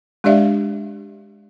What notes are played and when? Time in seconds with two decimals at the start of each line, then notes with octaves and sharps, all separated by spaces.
0.24 G#3 D4 G4 D5 E5 F5